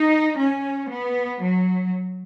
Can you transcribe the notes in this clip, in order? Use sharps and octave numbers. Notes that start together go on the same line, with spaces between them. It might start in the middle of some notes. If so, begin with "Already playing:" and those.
Already playing: D#4
C#4
B3
F#3